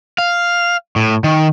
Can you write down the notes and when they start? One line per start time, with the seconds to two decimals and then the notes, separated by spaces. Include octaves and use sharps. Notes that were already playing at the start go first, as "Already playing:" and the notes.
0.18 F5
0.96 A2
1.24 D#3